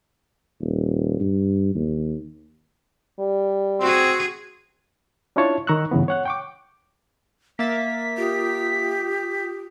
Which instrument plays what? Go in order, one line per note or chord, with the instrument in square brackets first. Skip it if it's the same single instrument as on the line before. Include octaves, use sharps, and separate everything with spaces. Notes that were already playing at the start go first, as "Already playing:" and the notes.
[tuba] D#1
G2
D#2
[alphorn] G3
[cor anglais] C4 [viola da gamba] F#4 G#4
[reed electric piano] C#4 D4 E4 F4 C#5 A5
D#3 A#5 C#6 E6 F#6
G2 C#3 E3 B3
C#5 F#5 F#6
G5 C#6 D6
[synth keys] A#3 E5 A6 [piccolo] B6
[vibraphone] F4 D#6 [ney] G4